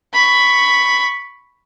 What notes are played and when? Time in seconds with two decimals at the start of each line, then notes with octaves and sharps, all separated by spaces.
0.14 B5 C#6